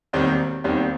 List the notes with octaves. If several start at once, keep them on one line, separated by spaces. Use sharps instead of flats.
E1 D#2 D#3 G3 C4
E1 D#2 D#3 G3 C4